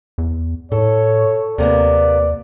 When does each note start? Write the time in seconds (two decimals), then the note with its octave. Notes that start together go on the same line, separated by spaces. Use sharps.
0.18 E2
0.72 A2 A4 C#5
1.58 D#2 C3 A#3 B3 D5